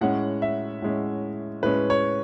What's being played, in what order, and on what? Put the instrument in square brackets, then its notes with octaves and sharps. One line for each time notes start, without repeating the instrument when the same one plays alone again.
[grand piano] A2 G#3 C#4 F#5
E5
A2 G#3 C#4
A2 G#3 C#4 B4
C#5